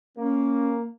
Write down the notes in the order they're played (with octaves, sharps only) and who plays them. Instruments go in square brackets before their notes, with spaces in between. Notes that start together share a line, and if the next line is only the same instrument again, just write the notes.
[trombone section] A#3 [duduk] C#4